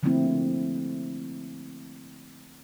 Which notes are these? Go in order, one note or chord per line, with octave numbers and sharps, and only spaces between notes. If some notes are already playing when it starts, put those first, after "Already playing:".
D3 F3 A3 A#3 C4 E4